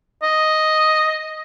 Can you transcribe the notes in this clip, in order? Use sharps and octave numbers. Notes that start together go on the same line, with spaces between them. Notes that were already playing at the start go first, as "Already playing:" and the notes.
D#5